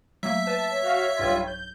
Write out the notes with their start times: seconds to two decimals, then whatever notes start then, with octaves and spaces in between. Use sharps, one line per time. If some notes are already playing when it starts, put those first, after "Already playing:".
0.23 F#3 A3 A#3 E5
0.47 B4 A5
0.71 C#5
0.83 F#4 F5
1.17 B1 G2 G3 F4 G#6
1.47 G6